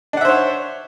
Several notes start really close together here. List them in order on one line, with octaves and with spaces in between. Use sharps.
D4 F#5 E5 C5 C#5